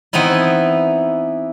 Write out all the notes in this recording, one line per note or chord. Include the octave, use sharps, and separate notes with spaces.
E3 B3 C4 D#4 E4